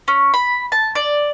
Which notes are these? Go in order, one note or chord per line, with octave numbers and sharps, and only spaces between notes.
C#4
B5
A5
D5